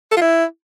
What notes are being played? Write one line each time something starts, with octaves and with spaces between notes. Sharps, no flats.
A4
F4
E4